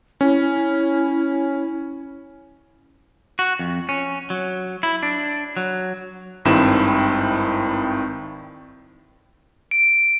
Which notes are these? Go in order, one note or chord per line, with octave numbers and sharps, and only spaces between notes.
C#4 E4
F#4
F2
C#4
F#3
E4
D4
F#3
G#1 G2 D#3 C4 E4 E7
D7